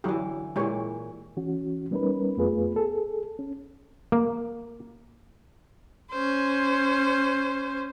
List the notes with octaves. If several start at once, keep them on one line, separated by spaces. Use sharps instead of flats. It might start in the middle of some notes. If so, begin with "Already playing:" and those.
D3 E3 F#3 E4 G4
A#2 E3 G#3 G4 C#5
E3 C#4 F#4
G3 B3 C#4 D#4 A#4 B4
F2 A3 B3 F4 G#4 B4
G#4 A4
C#4
A#3
C#4 C5